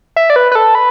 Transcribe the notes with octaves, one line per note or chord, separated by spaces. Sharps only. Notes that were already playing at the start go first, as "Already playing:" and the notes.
E5
D5
B4
B4
A4
B4